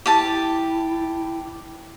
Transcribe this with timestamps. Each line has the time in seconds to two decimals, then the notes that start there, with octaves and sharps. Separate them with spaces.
0.06 E4 G4 A5